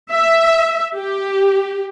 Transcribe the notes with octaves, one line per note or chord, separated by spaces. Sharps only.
E5
G4